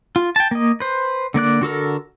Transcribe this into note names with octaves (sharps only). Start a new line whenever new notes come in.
F4
G5 A5
A#3 D#5
B4 C5
D3 A#3 D5 F#6
D3 F#4 A4 A#4